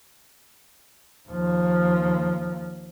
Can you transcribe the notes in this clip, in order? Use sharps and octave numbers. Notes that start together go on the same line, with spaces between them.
D#2 F3